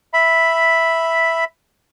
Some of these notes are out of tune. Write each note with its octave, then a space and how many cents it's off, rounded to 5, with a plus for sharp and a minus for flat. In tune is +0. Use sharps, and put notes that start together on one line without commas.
E5 +0 B5 +0